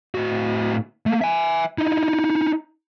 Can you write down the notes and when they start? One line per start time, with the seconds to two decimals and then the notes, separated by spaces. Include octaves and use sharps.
0.15 A2 F#4
1.06 A3 A#3
1.21 E5 G#5
1.78 D#4 E4